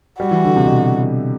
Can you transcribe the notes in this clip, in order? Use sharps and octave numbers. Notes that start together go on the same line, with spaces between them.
G3 F#4
E3
D3
C3
B2